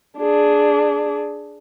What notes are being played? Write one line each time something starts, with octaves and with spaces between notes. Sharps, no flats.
D4 G#4